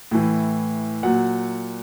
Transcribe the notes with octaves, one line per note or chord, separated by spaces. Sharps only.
A2 E3
A#2 F#3 F#5